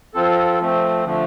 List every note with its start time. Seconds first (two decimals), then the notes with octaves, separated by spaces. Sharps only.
0.14 F3 C4 F4 A4
0.60 F3 A3 C4
1.05 D3 F3 A3